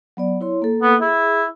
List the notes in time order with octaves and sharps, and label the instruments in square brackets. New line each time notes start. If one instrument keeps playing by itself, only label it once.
[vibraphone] F#3 B3 D5
E4 C#5 C6
A#3 A4
[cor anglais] B3
[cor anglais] E4 [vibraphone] G#4